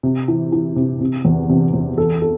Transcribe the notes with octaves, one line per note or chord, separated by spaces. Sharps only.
C3
E3
E3
C3
C3
E2
C3
E2
A4
A4